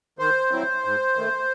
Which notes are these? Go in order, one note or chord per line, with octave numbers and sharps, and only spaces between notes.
D#3 C5
F#3 C4 E4
G#2
D#3 A3